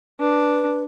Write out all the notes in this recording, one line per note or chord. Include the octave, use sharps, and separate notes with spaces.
D4 B4